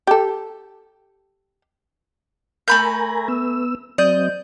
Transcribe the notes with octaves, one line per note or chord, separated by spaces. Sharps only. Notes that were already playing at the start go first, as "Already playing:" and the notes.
G4 A4
A3 A#4 G#5 A#5 B5 G6
B3 E6
F#3 C4 D5 D#5 G6